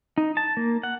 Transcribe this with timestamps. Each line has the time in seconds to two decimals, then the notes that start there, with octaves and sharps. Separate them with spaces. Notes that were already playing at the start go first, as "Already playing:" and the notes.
0.18 D#4
0.37 A5
0.57 A#3
0.83 F#5